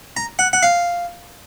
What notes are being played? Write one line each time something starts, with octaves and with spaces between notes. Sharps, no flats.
A#5
F#5
F#5
F5